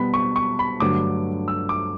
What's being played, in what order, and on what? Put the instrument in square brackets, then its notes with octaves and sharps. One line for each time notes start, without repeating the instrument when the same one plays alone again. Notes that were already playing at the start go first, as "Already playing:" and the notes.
Already playing: [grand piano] B2 G3 B3 B5
C#6
C#6
B5
G2 D3 F#3 A3 D6
E6
D6